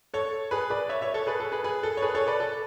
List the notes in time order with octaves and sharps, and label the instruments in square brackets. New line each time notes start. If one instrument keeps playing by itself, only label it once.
[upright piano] A4 C#5
G#4 B4
B4 D5
C#5 E5
C#5 E5
A4 C#5
G#4 B4
A4
G#4 B4
G#4 B4
A4
C#5
G#4 B4
A4 C#5
B4 D5
A4